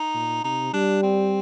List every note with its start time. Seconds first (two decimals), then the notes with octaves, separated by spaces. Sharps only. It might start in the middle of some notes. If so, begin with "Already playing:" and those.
Already playing: D#4
0.15 A#2
0.44 C3 D#4
0.73 G3 D4
1.03 C4